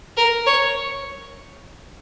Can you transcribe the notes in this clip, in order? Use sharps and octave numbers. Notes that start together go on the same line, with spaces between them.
A#4
C#5